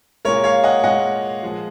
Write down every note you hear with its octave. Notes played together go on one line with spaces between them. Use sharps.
A#2 G#3 A#4 C#5
C#5 F5
D#5 F#5
A#2 G#3 D#5 F#5
F3 G#3